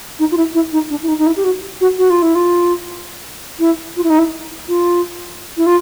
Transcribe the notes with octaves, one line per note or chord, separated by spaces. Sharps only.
D#4
F4
E4
E4
D#4
D4
E4
D#4
D#4
E4
G4
F#4
F#4
F#4
F4
E4
F4
E4
F4
E4
D#4
E4
F4
E4
F4